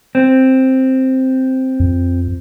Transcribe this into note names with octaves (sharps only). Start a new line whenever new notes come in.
C4
F2